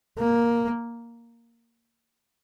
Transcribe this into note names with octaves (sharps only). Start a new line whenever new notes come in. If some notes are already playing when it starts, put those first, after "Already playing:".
A#3